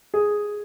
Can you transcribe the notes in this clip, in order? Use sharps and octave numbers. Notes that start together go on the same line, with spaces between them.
G#4